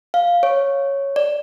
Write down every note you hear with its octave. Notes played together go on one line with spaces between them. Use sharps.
F5
C#5
D5